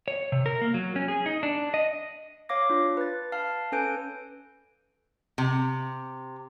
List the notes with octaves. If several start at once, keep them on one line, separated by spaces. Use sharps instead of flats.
C#5
C3
A#4
A#3
F#3
C#4
G#4
D#4
D4
D#5
C#5 F5 D6 A#6
D4 F4
B4 A6
F5 A5 F6
C#4 A4 B4 G#5 G6 D7
C3